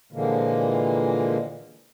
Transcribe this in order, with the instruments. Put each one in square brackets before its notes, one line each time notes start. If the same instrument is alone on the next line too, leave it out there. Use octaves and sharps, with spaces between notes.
[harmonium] A#2 D3 E3 F3 G#3 A#3